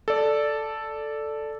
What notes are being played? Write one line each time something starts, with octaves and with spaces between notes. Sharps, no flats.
A4 D5